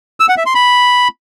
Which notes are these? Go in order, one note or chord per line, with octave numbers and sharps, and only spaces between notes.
E6
F#5
E5
C6
B5